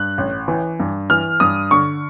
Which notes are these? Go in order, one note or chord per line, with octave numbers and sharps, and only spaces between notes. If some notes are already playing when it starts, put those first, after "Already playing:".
Already playing: G2 F#6
A1
E3
G2
E3 F6
G2 D#6
D3 C#6